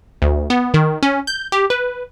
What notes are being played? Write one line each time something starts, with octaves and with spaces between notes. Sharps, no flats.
D2
B3
D#3
C#4
G6
G4
B4